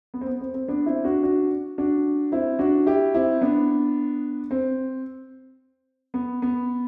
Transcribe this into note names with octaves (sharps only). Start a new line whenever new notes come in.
B3
C4
B3
C4
C4
B3 D4
C4 E4
D4 F#4
D4 F#4
D4 F#4
C4 E4
D4 F#4
E4 G4
C4 E4
B3 D4
C4
B3
B3